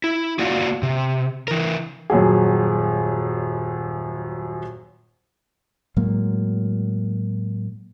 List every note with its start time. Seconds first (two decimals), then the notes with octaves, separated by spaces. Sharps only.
0.04 E4
0.39 A#3 F4 F#4 D5 F5
0.83 C3
1.48 E3 A#4
2.10 D#1 F#2 F#3 G#4
5.97 A2 F#3 G#3 A#3